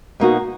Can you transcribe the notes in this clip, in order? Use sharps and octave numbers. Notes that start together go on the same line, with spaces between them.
B2 A#3 D#4 F#4